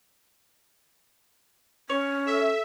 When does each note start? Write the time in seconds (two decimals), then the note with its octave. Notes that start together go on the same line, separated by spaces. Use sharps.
1.90 C#4 C#5
2.27 A4 E5